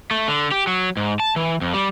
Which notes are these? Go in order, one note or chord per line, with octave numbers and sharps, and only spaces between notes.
A3
D3
G4
F#3
G#2
A5
E3
F2
G3